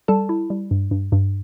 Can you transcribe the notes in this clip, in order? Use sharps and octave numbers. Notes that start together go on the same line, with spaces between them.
G3 A4 A5
E4
G3
G2
G2
G2